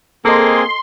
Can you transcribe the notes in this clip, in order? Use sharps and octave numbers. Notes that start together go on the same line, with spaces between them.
A#3 C4 G#4 A4 D#5 G#5 C6